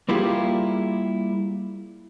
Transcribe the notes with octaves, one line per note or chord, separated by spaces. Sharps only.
G3 A#3 E4 F4 G4 G#4